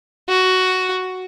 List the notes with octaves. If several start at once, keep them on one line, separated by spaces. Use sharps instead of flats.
F#4